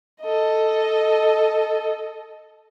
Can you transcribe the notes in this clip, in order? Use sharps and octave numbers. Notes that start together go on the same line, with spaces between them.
A4 D#5